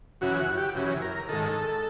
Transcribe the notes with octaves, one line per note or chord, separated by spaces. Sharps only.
F#2 C#3 E3 F#4
F#4
G4
F#2 C#3 E3
A#4
G#2 D#3 A4